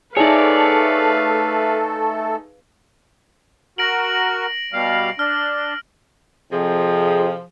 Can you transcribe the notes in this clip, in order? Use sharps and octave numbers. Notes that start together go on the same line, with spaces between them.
A3 D#4 G#4 A4 B4 C#5 D5 F5
F#4 A#4 A#6 D7 F#7
B2 G3 F5
D4 F6
F2 C3 F3 G#4